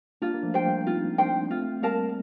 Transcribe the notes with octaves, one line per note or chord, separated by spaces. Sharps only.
A#3 D4 F4
A#3
F3 A3
C5 G5
G3 A#3
C4 D#4 F4
A#3 D4 C5 G5
A3 C4 F4
G3 A#3 A#4 F5 A5